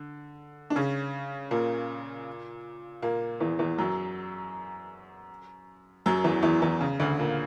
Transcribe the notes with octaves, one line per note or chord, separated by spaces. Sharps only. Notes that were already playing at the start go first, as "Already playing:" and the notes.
Already playing: D3
D4
C#3 C#4
A#2 A#3
A#2 A#3
E2 E3
E2 E3
F#2 F#3
F#2 F#3
E2 E3
E2 E3
E2 E3
C#3
D2 D3
A#2 A#3